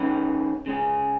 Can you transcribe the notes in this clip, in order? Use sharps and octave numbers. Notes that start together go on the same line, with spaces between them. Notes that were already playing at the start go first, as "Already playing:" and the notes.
Already playing: D#3 G#3 C#4 B4
C#3 G#3 C#4 G#4